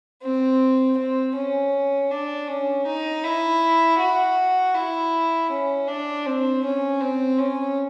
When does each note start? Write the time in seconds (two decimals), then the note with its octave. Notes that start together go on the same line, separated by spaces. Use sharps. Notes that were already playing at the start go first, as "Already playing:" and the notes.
0.22 C4
0.97 C4
1.35 C#4
2.11 D4
2.48 C#4
2.86 D#4
3.24 E4
3.99 F#4
4.75 E4
5.50 C#4
5.88 D4
6.26 C4
6.64 C#4
7.01 C4
7.39 C#4